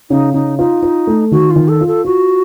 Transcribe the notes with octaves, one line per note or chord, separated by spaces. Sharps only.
C#3 D#4
C#3 D#4
D#4 F4
F4
A3
D#3 F#4
F4
D#3
A4
F4
A4
F4 F#4